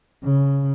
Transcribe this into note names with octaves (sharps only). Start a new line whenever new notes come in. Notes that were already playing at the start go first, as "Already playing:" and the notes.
C#3